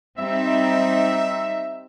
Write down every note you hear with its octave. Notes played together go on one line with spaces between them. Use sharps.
G3 C4 D#4 E5